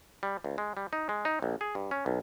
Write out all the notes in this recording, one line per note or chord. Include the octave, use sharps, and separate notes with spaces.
G3
C#2
G#3
G3
D#4
G#3
D#4
A#1
G#4
G2
C#4
B1